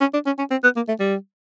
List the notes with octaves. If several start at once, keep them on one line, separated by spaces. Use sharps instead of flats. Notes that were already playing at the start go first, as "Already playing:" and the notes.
C#4
D4
C#4
C#4
C4
B3
A#3
A3
G3